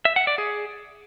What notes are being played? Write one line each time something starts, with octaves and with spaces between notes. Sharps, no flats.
E5
F#5
D5
G#4